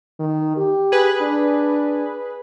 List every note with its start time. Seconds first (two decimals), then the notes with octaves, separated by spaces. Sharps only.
0.19 D#3
0.56 G4
0.92 G#4 B4
1.21 D4